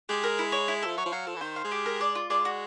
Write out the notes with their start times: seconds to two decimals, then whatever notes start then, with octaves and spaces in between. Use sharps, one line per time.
0.09 G#3 G4
0.23 A#4
0.39 E4
0.52 C#5
0.68 E4
0.82 F3 A4
0.98 F#3 C#5
1.06 F3
1.13 F#3 F5
1.27 F3 A4
1.36 E3
1.41 D#3 C5
1.56 F5
1.64 G#3
1.71 G4
1.86 A#4
2.01 D5
2.15 F4
2.30 G#3 D5
2.45 F#4